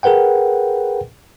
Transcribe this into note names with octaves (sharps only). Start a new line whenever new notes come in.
G#4 A#4 B4 F#5 G5